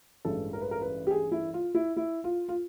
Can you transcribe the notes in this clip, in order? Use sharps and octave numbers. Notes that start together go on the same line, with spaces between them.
A1 G2 E3 G#3 A4
A#4
B4
A#4
B4
G4
G#4
E4
F4
E4
E4
F4
F4